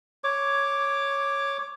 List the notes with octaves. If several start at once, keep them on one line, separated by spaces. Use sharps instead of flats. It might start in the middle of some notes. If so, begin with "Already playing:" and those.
C#5 D6